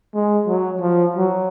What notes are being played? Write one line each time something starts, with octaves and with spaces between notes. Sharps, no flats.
G#3
F#3
F3
F#3